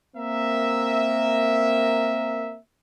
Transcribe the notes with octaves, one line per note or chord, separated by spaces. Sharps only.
A#3 C4 A#4 E5